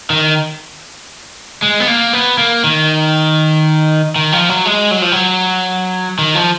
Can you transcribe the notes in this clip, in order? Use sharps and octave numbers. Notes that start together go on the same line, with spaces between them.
D#3
G#3
B3
A#3
B3
A#3
D#3
D#3
F3
F#3
G#3
F#3
F3
F#3
D#3
F3